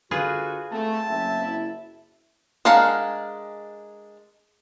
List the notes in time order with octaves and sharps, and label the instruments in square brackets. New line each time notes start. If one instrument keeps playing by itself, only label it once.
[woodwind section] D3 F#4 [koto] F4 G#4 B4
[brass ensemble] A3 [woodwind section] C4 [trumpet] A5
[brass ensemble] F#1 E5
[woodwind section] E4
[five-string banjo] G#3 D4 A#4 F5 F#5